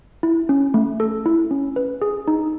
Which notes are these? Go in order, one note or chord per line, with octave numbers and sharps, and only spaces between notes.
E4
C#4
A3
A4
E4
C#4
B4
G#4
D#4